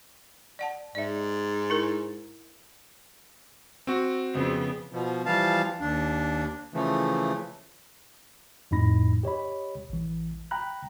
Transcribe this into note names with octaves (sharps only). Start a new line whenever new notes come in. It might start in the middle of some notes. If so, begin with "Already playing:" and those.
D5 F#5 A5
G#2 D5 E5
E4 A#4
C4 F#4
F2 C#3 B3
B2 F3
E3 F3 G3 F5 A5
D#2 D4
C#3 E3 F3 A3
F2 A2 D#4 B5 A#6
G4 C#5 D#5 B5
A1 E3
G5 A#5 B5 F#6